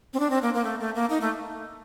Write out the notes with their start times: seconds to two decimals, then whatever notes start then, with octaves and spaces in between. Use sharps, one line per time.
0.14 C4
0.20 D4
0.30 C4
0.42 A#3
0.54 A#3
0.65 A3
0.80 A3
0.95 A#3
1.10 D#4
1.21 A3